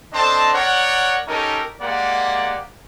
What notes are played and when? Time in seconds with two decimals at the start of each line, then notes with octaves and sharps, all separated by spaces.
0.13 C4 D4 A4 C5 D#5 A5
0.54 A#4 C#5 D5 F#5
1.28 C#4 D#4 G4 A4 A#4
1.81 G#3 A#3 G4 D5 F#5